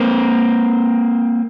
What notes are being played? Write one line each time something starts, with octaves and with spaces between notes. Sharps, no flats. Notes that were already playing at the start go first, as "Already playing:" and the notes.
Already playing: A#3 C4